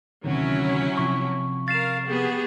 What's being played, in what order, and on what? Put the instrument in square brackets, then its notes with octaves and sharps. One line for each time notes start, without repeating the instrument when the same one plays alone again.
[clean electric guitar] D2 C3 D#3 [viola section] F#3 C#4 E4
[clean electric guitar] C3 F3 [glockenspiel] C#6
[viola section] A#4 F5 [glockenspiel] A6 C7 E7
[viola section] B3 G4 G#4